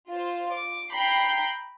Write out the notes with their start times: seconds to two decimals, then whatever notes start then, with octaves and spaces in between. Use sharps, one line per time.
0.11 F4 C5
0.54 D6
0.92 G5 A#5 B5 G6 C7